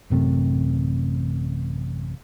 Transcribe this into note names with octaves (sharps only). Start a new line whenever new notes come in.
A1 F#2 C3 A3